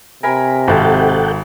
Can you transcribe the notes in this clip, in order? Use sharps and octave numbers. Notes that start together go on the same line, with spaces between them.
C3 A#4 G#5 B5
G#1 A4 F#5 G5 A5 B5